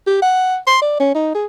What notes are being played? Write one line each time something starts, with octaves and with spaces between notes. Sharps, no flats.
G4
F#5
C6
D5
C#4
D#4
G#4